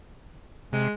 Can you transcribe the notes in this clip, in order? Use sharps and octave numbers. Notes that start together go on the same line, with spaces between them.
C3 G#3